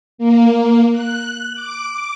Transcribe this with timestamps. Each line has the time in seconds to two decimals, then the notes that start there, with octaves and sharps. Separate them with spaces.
0.18 A#3
0.92 F#6
1.54 D6